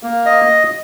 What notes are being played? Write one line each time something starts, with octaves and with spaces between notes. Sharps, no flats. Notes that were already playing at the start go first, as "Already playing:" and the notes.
A#3
D#5